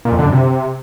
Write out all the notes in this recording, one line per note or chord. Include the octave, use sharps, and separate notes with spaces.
A#2
F2
D3
F#2
C3